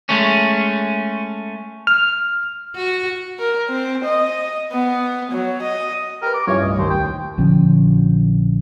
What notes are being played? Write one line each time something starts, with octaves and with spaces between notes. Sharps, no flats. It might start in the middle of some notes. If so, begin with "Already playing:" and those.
G#3 A3 C#4
F6
F#4
A#4
C4
D#5
B3
F#3
D#5
G4 A#4 B4
D6
G2 C#4 E4 F4 C#5
C2 F#2 A2 D#5
D#2 C5
G5
A#1 D3 F3 C#4